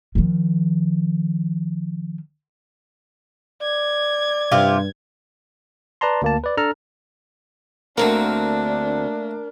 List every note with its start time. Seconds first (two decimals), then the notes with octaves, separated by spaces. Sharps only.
0.15 D#3 F3
3.62 D5 G#6
4.52 G2 C3 F4 G4
6.01 B4 D5 A5 A#5 C6
6.22 D2 A#3 A5
6.44 B4 D5
6.57 D4 A4 A5 A#5 F6
7.97 D2 D3 A3 A#3 C4 D4 A#4